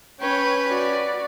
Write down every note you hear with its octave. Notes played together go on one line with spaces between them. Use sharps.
C#4 B4 C#5 G5
F#4 D5